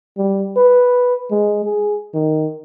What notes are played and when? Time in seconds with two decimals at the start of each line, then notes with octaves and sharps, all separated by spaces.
0.18 G3
0.57 B4
1.31 G#3
1.65 G#4
2.14 D#3